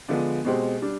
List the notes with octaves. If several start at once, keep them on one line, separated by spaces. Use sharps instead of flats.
D3 F3 G#3 B3 D4
B2 G#3 C4 G4 C5
G3 D4